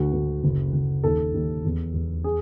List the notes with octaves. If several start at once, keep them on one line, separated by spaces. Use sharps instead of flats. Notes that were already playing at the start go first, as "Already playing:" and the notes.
Already playing: D2 F#4
D2
F#1
F#1
D#2 A4
D#2
E2
E2
G#4